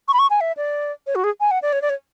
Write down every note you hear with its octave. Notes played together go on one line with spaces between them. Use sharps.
C#6
B5
C#6
G#5
E5
D5
C#5
F#4
G#4
G#5
F#5
D5
C#5
D5
C#5